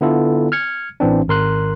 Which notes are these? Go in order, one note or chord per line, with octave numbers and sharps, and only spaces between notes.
D3 B3 E4 F4 A4
F6 G#6 C#7
A1 E3 C4 D4
G#1 A#4 C6 F#6